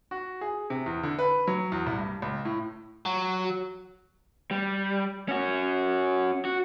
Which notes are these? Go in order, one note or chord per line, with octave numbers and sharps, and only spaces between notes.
F#4
G#4
C3
E2
D3
B4
F#3
E2
C2
G2
C#2
A2
F#3
G3
C#4 F#4
F#4